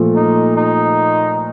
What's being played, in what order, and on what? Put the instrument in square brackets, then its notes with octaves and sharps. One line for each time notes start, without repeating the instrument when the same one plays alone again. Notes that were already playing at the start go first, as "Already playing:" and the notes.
Already playing: [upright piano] A#2 F3 A3
[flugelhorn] D#4
D#4